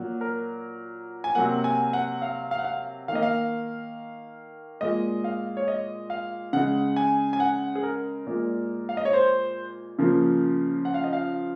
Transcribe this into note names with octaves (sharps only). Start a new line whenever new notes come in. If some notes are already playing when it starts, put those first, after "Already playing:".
Already playing: A#2 F#3 A#3
A#4
G#5
C3 F#3 A#3 F#5
G#5
F#5
F5
F5
F#5
F5
D#3 A#3 D#5 F5
F5
A#2 G#3 D#5
F5
C#5
D#5
F5
C#3 G#3 F#5
G#5
G#5
F#5
G#4
A#4
A#2 G#3
F5
D#5
C#5
C5
C#3 F3 A#3
F#5
F5
D#5
F5